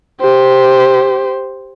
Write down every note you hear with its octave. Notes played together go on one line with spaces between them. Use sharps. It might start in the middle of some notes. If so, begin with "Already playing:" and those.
G4 C5